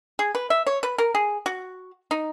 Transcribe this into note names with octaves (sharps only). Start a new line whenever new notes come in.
G#4
B4
E5
C#5
B4
A#4
G#4
F#4
D#4